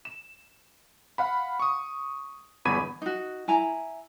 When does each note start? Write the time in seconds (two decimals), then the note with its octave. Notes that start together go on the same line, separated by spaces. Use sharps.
0.05 E7
1.18 F5 F#5 B5
1.60 C#6 D#6
2.65 G1 E2 B3 B5 G#6 D#7
3.02 D#4 F#4
3.48 E4 G#5 A#5